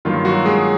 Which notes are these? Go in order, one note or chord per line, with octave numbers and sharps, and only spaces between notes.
G2 D#3 F#3 A#3 F4
F#3 F#4
G#3 G#4